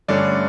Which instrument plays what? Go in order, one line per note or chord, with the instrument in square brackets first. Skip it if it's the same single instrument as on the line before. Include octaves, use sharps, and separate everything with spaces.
[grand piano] G2 D3 A3 C#4 D5